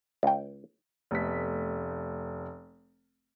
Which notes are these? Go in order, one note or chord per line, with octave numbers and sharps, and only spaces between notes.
C#2 G5
F1 A3 B3 B6